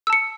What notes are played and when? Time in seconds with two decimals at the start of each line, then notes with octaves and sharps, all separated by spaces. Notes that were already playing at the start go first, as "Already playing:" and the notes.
0.07 E6
0.10 A5
0.13 C#7